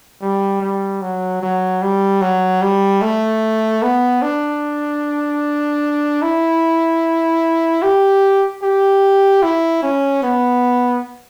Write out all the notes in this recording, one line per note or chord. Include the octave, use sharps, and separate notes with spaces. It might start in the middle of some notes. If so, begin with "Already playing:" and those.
G3
G3
F#3
F#3
G3
F#3
G3
A3
B3
D4
E4
G4
G4
E4
C#4
B3